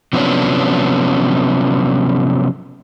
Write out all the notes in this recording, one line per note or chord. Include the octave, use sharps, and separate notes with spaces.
C3 F3 F#3 B3 C#4 D4